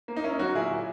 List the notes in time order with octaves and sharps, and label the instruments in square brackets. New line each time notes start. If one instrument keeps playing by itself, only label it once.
[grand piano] A#3
D#4
A#3 C#4 E4
F#3 D#4 F#4
A#2 E4 G#4
A#2